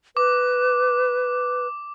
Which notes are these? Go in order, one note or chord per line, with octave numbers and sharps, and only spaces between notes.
B4 D6